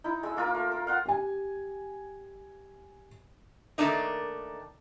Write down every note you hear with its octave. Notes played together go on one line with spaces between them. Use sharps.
D#4 E4
G#3 E6
A#3 F4 A#4
A3
A#4
F5 F#5 C6
G4 G#5
D#3 A3 A#3 D4 D#4